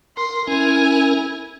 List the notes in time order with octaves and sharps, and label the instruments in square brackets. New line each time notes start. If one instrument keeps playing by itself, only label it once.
[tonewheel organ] A#4 [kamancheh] C6
[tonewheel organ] C#4 A#4 [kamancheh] E4 G#5